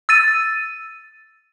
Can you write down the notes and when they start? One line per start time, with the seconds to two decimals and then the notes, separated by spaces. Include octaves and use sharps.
0.09 E6 A6 D#7